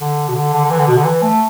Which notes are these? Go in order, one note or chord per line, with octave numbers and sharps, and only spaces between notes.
D3
B2
D3
D3
D3
E3
D3
B2
D3
E3
A3